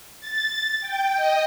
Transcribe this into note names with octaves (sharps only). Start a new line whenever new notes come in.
A6
G5
D#5